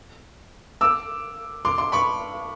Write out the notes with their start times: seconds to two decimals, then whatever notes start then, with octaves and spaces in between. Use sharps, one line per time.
0.81 D6 E6
1.65 C6 D6
1.78 C6 D6
1.92 B5 C#6